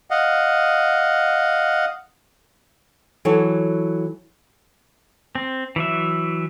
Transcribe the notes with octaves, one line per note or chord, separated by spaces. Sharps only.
D#5 F5 F#5
E3 F#3 A4 C#5
C4
E3 F#3 E5